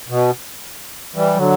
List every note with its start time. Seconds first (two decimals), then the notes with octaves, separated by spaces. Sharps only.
0.08 B2
1.15 E3 G3
1.37 D3 F#3